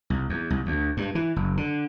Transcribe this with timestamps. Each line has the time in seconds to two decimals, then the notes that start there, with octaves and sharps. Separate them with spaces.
0.10 C2
0.29 E2
0.50 C2
0.66 D2
0.97 G2
1.15 E3
1.36 F#1
1.57 D3